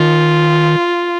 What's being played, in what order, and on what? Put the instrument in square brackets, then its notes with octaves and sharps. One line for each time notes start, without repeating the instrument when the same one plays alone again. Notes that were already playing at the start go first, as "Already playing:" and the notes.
Already playing: [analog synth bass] D#3 [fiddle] F4